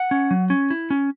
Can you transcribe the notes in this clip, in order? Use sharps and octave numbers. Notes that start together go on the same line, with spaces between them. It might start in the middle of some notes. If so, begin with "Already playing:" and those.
Already playing: F#5
C#4
F#3
C#4
E4
C#4